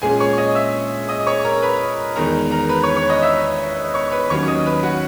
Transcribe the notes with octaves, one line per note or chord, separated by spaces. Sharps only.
A#2 G#3 C#4 G#4 G#5
C#5 C#6
D#5 D#6
E5 E6
D#5 D#6
C#5 C#6
A#4 A#5
B4 B5
E2 D#3 G#3 A#4 A#5
A#4 A#5
B4 B5
C#5 C#6
C#5 C#6
D#5 D#6
E5 E6
C#5 C#6
B4 B5
D#2 D#3 F#3 C#4 C#5 C#6
D#5 D#6
B4 B5
F#4 F#5